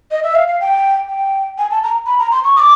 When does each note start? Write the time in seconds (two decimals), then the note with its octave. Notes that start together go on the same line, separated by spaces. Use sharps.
0.11 D#5
0.23 E5
0.35 F5
0.48 F5
0.61 G5
1.09 G5
1.58 G#5
1.71 A5
1.83 A#5
2.06 B5
2.19 A#5
2.31 C6
2.44 C#6
2.56 D#6
2.60 D6